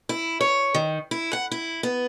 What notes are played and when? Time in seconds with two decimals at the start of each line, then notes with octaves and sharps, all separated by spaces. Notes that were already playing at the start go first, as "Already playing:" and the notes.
0.09 E4
0.41 C#5
0.74 D#3
1.11 E4
1.33 F#5
1.51 E4
1.83 B3